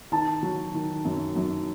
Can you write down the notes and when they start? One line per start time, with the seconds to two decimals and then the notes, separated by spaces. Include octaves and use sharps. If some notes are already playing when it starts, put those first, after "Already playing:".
0.12 D#3 A5
0.43 F#3
0.74 D#3
1.05 F#2
1.36 F#2